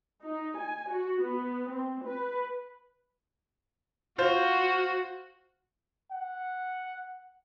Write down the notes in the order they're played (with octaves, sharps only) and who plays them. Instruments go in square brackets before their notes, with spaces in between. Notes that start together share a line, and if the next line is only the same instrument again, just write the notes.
[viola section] D#4
G#5
F#4
B3
C4
B4
[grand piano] F4 C5 [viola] F#4
[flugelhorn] F#5